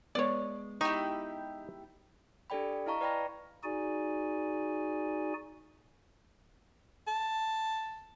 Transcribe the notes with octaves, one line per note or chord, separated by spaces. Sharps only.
G#3 B3 C#5 D5
D#4 E4 G4 C#6
D4 G4 A4 D5 G5 B5
E4 D#5 F5 A5 A#5 C#6
B4 D5 G5 B5 A#6
D#4 F#4 G#4 D5 G#5
A5